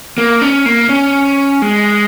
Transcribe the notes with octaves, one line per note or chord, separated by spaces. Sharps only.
A#3
C#4
A#3
C#4
G#3